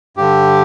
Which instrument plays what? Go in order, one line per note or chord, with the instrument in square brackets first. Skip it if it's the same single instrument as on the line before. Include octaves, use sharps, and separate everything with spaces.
[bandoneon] G2 D3 G4